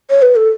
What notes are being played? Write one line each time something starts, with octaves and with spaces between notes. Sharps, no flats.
C#5
B4
A4